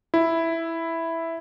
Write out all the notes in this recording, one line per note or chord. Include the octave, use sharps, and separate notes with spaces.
E4